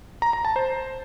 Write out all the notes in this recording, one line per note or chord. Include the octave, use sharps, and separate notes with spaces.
A#5
A#5
A5
C5